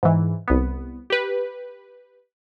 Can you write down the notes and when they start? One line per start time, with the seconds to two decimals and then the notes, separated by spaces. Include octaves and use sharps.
0.03 G#2 E3
0.48 C2 B3
1.10 G4 B4